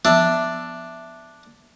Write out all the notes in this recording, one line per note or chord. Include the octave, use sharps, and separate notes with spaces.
F3 B3 D4 E5